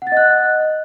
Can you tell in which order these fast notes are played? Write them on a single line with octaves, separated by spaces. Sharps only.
F#5 A6 D#5 F#6